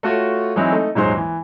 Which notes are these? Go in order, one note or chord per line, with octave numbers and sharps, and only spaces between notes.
A3 F4 F#4 A4 C#5
E3 F#3 G#3 C4 D#4 E4
A3 D#4
D#1 G#2 F#3 G#3 C5 C6
E3